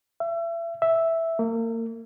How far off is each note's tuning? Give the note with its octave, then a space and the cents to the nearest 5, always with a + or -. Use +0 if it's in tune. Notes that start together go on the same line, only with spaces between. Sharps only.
E5 +35
E5 +0
A#3 -35